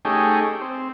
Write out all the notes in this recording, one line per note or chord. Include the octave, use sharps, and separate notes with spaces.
A3 C#4 D#4 G4 G#4
C4